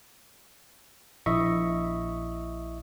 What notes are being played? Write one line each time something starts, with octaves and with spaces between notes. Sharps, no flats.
A#1 E4 D#5 E5 C#6